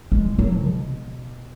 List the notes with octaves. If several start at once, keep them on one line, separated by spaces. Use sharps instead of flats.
G#3
F#3
B2